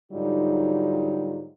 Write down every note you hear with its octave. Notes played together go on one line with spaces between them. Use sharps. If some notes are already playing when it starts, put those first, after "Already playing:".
G#2 D3 F#3 G3 D#4 F4